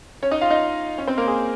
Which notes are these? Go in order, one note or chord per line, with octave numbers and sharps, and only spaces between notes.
C#4 C#5
D#4 D#5
F4 F5
D#4 D#5
C#4 C#5
C4 C5
A#3 A#4
G#4